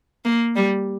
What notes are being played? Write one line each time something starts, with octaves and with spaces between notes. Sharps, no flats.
A#3
G3